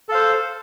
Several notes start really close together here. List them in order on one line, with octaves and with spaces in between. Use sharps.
A4 F5 C5